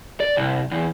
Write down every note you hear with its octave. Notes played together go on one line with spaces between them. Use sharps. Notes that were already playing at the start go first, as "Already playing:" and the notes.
D5
C2
E2